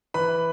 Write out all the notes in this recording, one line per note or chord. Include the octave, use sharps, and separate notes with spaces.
E3 B4 B5